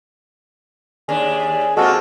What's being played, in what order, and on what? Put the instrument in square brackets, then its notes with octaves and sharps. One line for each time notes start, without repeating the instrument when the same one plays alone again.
[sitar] D#2 D4 [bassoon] G#4
[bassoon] G#3 [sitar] A#3 C4 F4 [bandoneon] F#4 A4